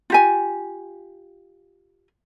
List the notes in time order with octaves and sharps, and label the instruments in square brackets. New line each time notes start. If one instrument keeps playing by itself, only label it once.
[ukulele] F4 G4 G#5